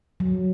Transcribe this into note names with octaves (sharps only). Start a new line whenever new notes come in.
F#3